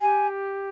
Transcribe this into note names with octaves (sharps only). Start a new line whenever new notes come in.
G4 G#5